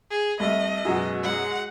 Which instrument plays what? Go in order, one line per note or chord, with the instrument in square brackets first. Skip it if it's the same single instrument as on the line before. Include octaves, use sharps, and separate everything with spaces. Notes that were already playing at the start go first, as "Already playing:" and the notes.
[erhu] G#4
[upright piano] C2 [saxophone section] A3 [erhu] D#5
[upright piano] F#2 B2 [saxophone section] G#3 F#4
[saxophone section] F#3 G#3 [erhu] F#5